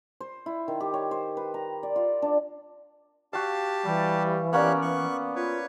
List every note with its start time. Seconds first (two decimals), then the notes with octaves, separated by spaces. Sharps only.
0.21 C5
0.46 E4
0.68 D#3
0.80 G4
0.94 C#5
1.11 C5
1.37 B4
1.54 A#5
1.83 D5
1.96 F4
2.22 D4
3.33 F#4 G4 F5 A5
3.85 E3 G3
4.53 A#3 B3 C#4 G4 C#5 D5 F#6
4.82 C#6 F#6
5.36 F4 B4 C#5